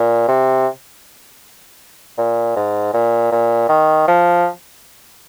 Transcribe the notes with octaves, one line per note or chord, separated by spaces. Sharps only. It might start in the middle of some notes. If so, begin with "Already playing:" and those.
Already playing: A#2
C3
A#2
G#2
A#2
A#2
D#3
F3